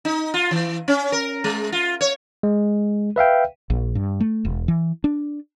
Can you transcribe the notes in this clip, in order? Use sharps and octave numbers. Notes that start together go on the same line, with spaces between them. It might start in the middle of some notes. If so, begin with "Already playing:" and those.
D#4
F4
E3
C#4
A#4
G#3
F4
C#5
G#3
B4 E5 F5 G5
A#1
G2
A3
E1
E3
D4